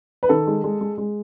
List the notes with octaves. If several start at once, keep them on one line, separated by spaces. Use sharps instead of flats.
B4
D#3 A4
G#3
G#3
G#3
G#3